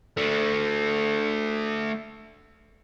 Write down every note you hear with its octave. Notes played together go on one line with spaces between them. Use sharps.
A3 D4